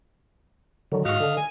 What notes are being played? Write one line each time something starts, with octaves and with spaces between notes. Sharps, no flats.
D3 D#3 F#3
G#2 F#4 D#5 F5
D3
G#5